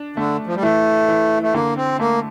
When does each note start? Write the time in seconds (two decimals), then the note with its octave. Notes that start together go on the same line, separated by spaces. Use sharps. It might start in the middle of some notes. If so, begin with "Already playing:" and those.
Already playing: D4
0.16 D3 A3
0.47 F3
0.55 G3
0.62 E3 A3
1.08 E3
1.42 A3
1.53 D3 A#3
1.76 C4
1.99 A3 A#3